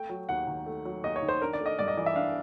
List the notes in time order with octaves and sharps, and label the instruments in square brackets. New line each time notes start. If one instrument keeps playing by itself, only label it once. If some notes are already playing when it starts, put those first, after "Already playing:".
Already playing: [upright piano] A3 G5
F#3
D#2 F#5
D#3
A3
F#3
D#2 D#5
C#5
D#3
C5
D4 A#4
D5
A3
D#5
G2 D5
D#5
E3 D5
E5
D4 F5